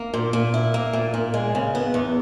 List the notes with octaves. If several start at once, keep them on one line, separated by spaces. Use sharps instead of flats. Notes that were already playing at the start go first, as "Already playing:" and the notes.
Already playing: A#3
A#2
A#2
E4
A#3
A#2
A#2
G#3
C#3
B3
E2